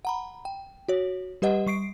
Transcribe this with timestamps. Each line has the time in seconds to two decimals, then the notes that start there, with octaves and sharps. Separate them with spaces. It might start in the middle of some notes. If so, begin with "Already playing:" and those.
0.05 F#5 A#5 B5
0.45 G5
0.88 F#4 C#5
1.42 G3 G4 B4 D#5 F#5
1.67 G3 C#6 C7 D7